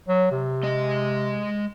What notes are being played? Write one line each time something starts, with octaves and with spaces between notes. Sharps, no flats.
F#3
C3
G#3 D#5